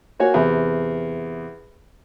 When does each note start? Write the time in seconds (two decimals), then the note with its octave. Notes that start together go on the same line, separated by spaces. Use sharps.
0.20 A#3 F#4 C#5 G#5
0.34 E2 C3